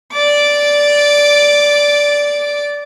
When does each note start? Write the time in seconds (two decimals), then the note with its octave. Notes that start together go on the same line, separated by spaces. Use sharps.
0.14 D5 D6